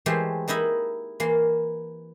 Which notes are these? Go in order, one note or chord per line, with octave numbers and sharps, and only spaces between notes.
E3 G#3 A3 G4 C5
A#3 D#4 E4 D#5 B5
E3 A#3 C6